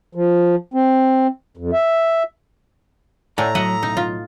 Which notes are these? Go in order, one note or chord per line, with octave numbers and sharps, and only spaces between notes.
F3
C4
F2
E5
A2 A3 D5 F#5 G#5 A#5
F#3 D#5 E5 F#5
B1 D#4
F4